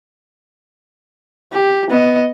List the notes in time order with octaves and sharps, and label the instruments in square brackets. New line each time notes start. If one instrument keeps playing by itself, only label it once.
[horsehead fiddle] G4
B3 D#5